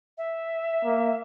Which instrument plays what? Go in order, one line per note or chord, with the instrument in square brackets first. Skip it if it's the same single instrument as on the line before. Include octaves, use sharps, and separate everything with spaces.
[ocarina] E5
[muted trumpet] A#3